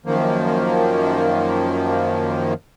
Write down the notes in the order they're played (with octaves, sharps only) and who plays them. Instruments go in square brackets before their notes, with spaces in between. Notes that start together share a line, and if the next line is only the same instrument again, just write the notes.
[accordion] F#2 D#3 F3 A#3